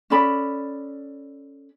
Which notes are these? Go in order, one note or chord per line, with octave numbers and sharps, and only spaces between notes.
C#4 A4 D5 B5